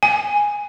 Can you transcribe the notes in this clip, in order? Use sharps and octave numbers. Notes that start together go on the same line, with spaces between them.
G#5